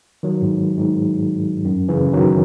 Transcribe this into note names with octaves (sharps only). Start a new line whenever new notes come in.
D#3 F#3
G#2
G#2
F#2
C#3 E3
D#3 F#3